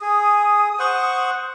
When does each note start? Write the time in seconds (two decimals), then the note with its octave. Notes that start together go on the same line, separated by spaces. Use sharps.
0.01 G#4 D#6
0.79 C5 F#5 C#6